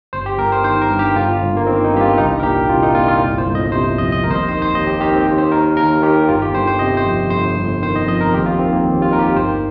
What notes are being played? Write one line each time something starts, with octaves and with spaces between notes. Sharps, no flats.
G1 C5
G4
G1 A#4
C5
D#3 C5
A#4
G2
G4
G1 F4
G1
A#3
D#3 C4
D#4
G2 G4
F4
C2 D#4
A#4
A#2 G4
C2 F4
D#4
A#2 F4
F4
G1
C5
G1
D#5
C3 C5
F2 D#5
D#5
D#2 A#4
C5
D#5
D#3 C5
C5
D#2 D#5
G4
D#3 G4
C4
D#2
C5
D#3 A#4
D#2 A#4
D#3 G4
G1 F4
G4
G1 C5
C5
C3 D#5
C5
F2
G1 C5
G1
D#3 C5
D#5
F2 D#5
A#4
D#2 G4
F4
D#3 C4
A#3
D#2
F4
D#3 A#4
G4
G1 C5